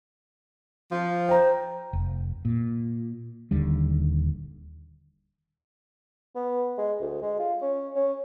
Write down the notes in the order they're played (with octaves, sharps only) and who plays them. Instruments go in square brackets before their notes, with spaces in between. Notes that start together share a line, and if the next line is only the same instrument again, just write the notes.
[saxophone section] F3
[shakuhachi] C5 [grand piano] G5 A#5
[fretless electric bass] F1
A#2
D#1 D#2 D3 G3
[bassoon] B3
G#3
D2
G#3
F4
C#4
C#4